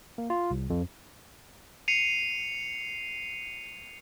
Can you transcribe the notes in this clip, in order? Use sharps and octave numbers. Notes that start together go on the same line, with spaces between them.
A#3
F4
C2
F2
C7 C#7 D#7 F7